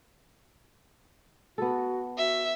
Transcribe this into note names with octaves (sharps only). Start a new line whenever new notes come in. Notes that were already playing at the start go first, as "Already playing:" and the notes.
B3 F#4 A4
F#4 E5